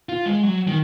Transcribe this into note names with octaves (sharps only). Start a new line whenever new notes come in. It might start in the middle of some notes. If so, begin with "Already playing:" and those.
F4
G#3
F#3
D#3